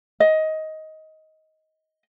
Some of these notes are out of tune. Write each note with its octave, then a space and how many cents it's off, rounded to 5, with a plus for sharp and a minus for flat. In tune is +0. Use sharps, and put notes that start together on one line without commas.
D#5 +15